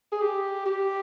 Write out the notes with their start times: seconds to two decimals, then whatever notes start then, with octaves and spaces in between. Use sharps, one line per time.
0.12 G#4
0.22 G4
0.66 G4